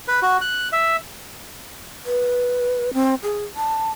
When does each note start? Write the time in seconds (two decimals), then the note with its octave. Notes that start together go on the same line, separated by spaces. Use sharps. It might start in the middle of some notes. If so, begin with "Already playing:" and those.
0.08 B4
0.22 F#4
0.41 F#6
0.72 E5
2.06 B4
2.94 C4
3.23 G#4
3.56 A5